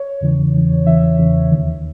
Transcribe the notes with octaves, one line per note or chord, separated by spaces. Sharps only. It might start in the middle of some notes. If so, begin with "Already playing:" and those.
Already playing: C#5
E2 C#3 E3
E2 C#3 E3
E2 C#3 E3 E5
E2 C#3 E3
D#2 D#3